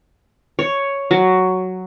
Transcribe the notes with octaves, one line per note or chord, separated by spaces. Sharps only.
C#5
F#3